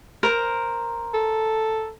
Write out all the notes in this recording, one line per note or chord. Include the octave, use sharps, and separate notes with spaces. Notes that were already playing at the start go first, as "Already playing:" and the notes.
A#4 C5
A4